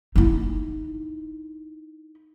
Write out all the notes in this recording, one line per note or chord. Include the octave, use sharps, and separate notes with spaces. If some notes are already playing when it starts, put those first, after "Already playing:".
D#4 E4